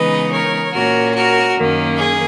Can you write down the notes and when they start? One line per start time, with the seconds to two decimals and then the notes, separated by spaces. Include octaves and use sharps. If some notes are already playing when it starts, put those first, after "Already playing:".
Already playing: C#3 E3 G#3 B3 D#4 B4 D#5
0.31 A#4 C#5
0.72 A#2 A#3 C#4 F#4 A#4
1.14 F#4 A#4
1.56 F#2 D#3 A#3 C#4
1.96 G#4